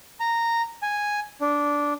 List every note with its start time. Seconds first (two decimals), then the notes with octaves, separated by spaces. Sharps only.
0.20 A#5
0.82 G#5
1.41 D4